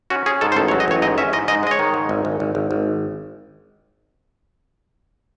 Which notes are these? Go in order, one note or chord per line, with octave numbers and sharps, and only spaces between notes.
C#4 F#4
C#4 G#4
G#2 A4
C5
A1 A4
C#5
F#3
D#5
A1 C#5
G#2 D#5
C#4 E5
G#2 D#5
G#2 D#5
G#3 D#5
C#5
D#3
G#2
G#1
G#1
G#1
G#1
G#1